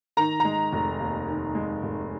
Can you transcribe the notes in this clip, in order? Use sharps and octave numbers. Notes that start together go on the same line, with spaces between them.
D#3 A#5
G#3 A#5
F1
D#2
D#3
G#3
F1